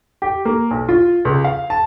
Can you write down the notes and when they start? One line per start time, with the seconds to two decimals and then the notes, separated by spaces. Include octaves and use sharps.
0.22 G4
0.45 A#3
0.71 B1
0.89 F4
1.25 C#2
1.44 F5
1.70 A5